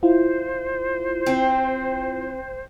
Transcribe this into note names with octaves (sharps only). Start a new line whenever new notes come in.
E4 F4 C5
C4